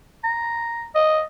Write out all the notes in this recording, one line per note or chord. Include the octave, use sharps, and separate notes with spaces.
A#5
D#5